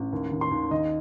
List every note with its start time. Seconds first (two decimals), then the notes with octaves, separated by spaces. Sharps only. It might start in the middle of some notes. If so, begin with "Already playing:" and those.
Already playing: A1
0.12 D#2
0.32 D#3
0.41 C6
0.51 D#2
0.71 D#3 D#5